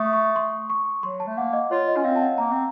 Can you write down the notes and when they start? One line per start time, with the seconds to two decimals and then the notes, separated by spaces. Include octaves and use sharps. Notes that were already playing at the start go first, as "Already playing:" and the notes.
Already playing: A3 C#6 D#6
0.13 C#6
0.36 C6
0.70 C#6
1.03 F#3 C6
1.20 A5
1.27 A3
1.37 A#3 F#5
1.53 D#5
1.71 F4 C#5
1.88 D#5
1.97 C#4
2.04 C4 F5
2.16 A5
2.21 F#5
2.38 A#3 A#5
2.51 C4